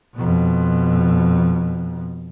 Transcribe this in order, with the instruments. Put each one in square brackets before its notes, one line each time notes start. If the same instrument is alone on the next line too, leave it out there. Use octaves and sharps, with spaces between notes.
[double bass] F2 B2